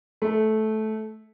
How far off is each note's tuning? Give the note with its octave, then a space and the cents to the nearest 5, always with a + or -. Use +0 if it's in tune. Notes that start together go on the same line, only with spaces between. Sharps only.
A3 -15